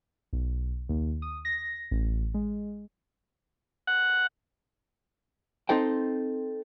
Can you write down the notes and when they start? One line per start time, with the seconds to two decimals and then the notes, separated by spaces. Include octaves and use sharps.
0.33 B1
0.89 D#2
1.22 D#6
1.45 A#6
1.91 A1
2.34 G#3
3.87 F#5
5.69 C4 D#4 A4 C5 G5